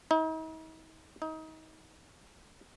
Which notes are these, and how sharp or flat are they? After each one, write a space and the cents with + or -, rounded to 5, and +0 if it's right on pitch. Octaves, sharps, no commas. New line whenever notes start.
D#4 +40
D#4 +25